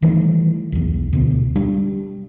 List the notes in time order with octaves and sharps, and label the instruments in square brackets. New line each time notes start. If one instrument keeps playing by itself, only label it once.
[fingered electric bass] D#3 E3 G3 A3
B1 E2
D2 B2
G3 D4